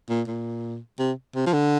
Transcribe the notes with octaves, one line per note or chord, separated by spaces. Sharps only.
A#2
A#2
C3
C3
F3
D3